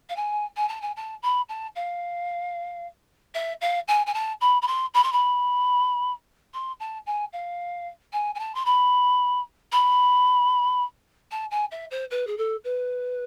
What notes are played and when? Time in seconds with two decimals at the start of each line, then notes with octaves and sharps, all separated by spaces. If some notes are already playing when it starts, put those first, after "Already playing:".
0.09 F5
0.16 G#5
0.57 G#5
0.69 A5
0.82 G#5
0.96 A5
1.23 B5
1.49 A5
1.76 F5
3.35 E5
3.61 F5
3.88 G#5
4.07 G#5
4.14 A5
4.41 B5
4.62 B5
4.68 C6
4.94 B5
5.03 C6
5.13 B5
6.54 C6
6.80 A5
7.06 G#5
7.33 F5
8.13 G#5
8.35 G#5
8.39 A5
8.55 C6
8.66 B5
9.72 B5
11.31 A5
11.51 G#5
11.71 E5
11.91 C5
12.11 B4
12.27 G#4
12.38 A4
12.64 B4